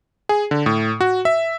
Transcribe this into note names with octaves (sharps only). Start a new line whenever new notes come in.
G#4
D3
A2
F#4
E5